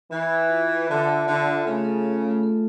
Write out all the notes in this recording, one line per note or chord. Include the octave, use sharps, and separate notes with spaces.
E3 E5
E5
F4
E5
D3 F4
A4
D3 A4
F4
C#3 A3
A4
F4
A3
A4